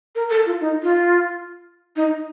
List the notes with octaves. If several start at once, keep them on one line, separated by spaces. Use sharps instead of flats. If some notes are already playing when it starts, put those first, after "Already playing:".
A#4
A4
F4
D#4
F4
D#4